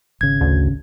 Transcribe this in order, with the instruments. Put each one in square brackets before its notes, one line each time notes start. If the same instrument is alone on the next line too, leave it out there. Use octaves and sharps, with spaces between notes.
[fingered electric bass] G#1 C#3 [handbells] G#6
[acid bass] D2